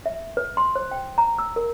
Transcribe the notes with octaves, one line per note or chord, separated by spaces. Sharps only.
E5
B4
C6
C5
G5
A#5
E6
A#4